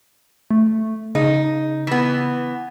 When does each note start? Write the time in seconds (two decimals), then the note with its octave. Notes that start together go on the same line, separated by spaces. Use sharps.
0.51 A3
1.15 C#3 D#4
1.87 E3 B3